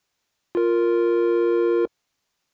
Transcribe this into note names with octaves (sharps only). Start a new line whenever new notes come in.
F4 A#4